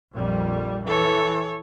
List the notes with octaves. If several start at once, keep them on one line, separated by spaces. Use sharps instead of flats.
A#1 F2 G3
E3 A4 C#5